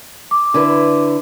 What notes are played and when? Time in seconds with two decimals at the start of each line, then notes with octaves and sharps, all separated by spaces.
0.31 D6
0.54 D3 E4 B4